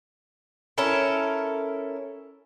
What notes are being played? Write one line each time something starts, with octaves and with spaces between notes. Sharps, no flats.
C#4 E4 A4 A#4